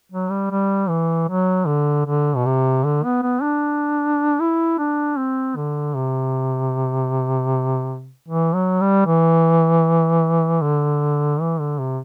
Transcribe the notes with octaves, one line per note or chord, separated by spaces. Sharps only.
F#3
G3
G3
E3
F#3
D3
D3
B2
C3
D3
B3
B3
D4
E4
D4
C4
D3
C3
E3
F#3
G3
E3
D3
E3
D3
C3